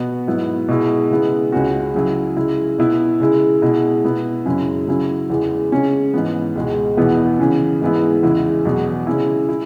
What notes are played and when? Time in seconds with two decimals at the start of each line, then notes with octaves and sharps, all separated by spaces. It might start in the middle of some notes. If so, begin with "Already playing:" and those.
Already playing: B2 B3 F#4
0.27 G#2 F#3 B3 E4
0.68 B2 G#3 E4
1.11 C#3 G#3 B3 E4
1.52 C#2 C#3 G#3 C#4 F#4
1.95 C#3 F#3 E4
2.36 C#3 G#3 E4
2.78 B2 B3 E4
3.20 C#3 G#3 E4
3.62 B2 G#3 B3 E4
4.04 B2 B3 E4
4.46 F#2 C#3 G#3 C#4 E4
4.87 C#3 F#3 C#4 E4
5.30 E2 C#3 E3 G#3
5.72 C#3 G#3 C#4
6.14 G#2 E3 B3
6.55 C#2 B2 G#3
6.97 E2 B2 B3 E4
7.39 C#3 E3 C#4
7.81 G#2 E3 G#3 B3 E4
8.23 E2 C#3 G#3 E4
8.65 E2 B2 F#3 B3
9.07 C#3 G#3 C#4 E4
9.49 E4